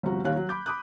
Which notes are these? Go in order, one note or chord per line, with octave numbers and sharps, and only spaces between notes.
G1 C2 F3 F#4 A#5
D#1 D#2 D#3 C#5 F5 F#6
F#3
B5 D6 G6
B5 D6 D#6 F#6